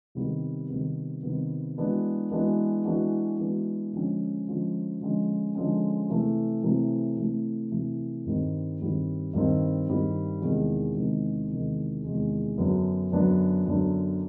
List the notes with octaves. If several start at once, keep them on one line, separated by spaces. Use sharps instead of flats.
C3 D#3 G3 B3
C3 D#3 G3 B3
C3 D#3 G3 B3
E3 G#3 B3 D4 F#4
E3 G#3 B3 D4 F#4
E3 G#3 B3 D4 F#4
E3 G#3 B3 D4 F#4
D3 F3 G#3 C#4
D3 F3 G#3 C#4
D3 F3 G#3 C#4
D3 F3 G#3 C#4
C3 E3 A3
C3 E3 A3
C3 E3 A3
C3 E3 A3
G2 D#3 G3 C4
G2 D#3 G3 C4
G2 D#3 G3 C4
G2 D#3 G3 C4
E2 C3 D#3 G#3
E2 C3 D#3 G#3
E2 C3 D#3 G#3
E2 C3 D#3 G#3
F#2 D3 F#3 B3 D4
F#2 D3 F#3 B3 D4
F#2 D3 F#3 B3 D4